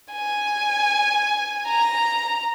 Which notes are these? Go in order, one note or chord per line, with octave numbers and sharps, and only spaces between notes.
G#5
A#5